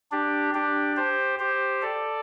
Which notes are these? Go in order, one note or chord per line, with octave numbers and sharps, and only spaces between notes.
D4 G4
D4 G4
G4 C5
G4 C5
A4 D5